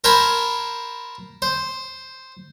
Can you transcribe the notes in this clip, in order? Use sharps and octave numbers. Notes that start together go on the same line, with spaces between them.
A#4 C5 G#5 A5 B5
C5